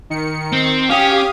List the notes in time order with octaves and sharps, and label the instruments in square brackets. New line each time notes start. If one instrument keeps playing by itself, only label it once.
[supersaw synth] D#3 C#7
[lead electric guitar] C4
[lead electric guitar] C#4 [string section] G4 [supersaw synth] F5 D#6